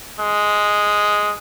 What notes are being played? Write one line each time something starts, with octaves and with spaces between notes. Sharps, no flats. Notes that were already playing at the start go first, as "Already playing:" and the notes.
G#3